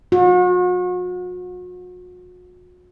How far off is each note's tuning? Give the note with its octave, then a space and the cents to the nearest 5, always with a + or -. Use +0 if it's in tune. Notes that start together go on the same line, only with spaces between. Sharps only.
F#4 -40